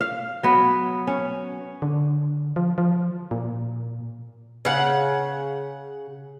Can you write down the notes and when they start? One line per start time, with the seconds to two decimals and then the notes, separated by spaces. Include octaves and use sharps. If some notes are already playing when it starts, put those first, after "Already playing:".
0.01 F5
0.43 F#3 B3
1.07 C#4
1.82 D3
2.56 F3
2.78 F3
3.31 A#2
4.65 C#3 F#5